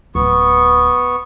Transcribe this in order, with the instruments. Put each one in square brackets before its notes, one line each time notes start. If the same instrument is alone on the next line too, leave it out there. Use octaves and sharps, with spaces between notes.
[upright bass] D1 [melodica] B3 C#6